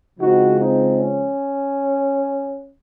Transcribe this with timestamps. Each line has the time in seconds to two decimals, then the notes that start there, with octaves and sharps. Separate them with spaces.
0.19 C#3 F3 G#3 C4 D#4 F#4
0.58 C4 D#4
0.98 C#4